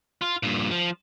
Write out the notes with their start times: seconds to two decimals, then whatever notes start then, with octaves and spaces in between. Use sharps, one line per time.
0.22 F4
0.43 G2 A#2
0.71 F3